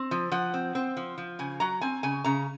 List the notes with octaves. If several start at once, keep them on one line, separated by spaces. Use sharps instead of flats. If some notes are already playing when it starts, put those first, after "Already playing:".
Already playing: C4
F3
F3 F#5
C4
C4
F3
F3
C#3 G#5
F#3 A#5
C4 G#5
C#3 G#5
C#3 A#5